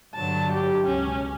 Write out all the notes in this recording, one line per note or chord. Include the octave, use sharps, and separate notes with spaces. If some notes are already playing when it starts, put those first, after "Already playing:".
G2 D3 F#3 A5
G4
C#2 B2 C#4